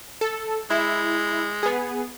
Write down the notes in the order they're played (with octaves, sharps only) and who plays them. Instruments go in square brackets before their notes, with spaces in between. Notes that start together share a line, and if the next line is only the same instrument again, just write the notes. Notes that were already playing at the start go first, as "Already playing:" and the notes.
[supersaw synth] A4
[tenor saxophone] G#3 [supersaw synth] E4
[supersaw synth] B3 G#4